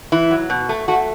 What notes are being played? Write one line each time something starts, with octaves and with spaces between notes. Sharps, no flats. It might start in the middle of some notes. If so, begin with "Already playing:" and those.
E3 E4
F#3
B2
A3
A3 F#4